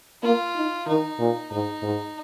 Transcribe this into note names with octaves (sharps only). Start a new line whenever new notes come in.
A#3 F4
D#4
D#3 D#4
A#2
G#2 D#4
G#2